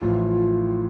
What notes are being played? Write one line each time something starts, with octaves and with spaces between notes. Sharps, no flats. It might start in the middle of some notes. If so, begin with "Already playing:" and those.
A1 A2 F3 F4